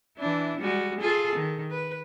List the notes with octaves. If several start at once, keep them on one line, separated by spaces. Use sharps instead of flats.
E3 D4 E4
G3 G#3 F#4
F4 G#4 A4
D#3
B4